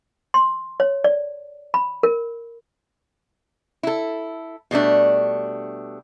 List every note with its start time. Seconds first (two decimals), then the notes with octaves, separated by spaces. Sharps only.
0.34 C6
0.80 C#5
1.04 D5
1.74 B5
2.03 A#4
3.83 E4 A4
4.71 B2 G3 A3 D4